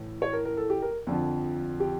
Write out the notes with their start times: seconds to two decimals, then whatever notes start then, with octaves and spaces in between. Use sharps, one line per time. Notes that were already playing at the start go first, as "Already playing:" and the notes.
Already playing: A2 E3
0.22 C#5
0.33 A#4
0.45 A#4
0.57 A4
0.70 G4
0.82 A#4
1.07 F2 D3 F3
1.80 G4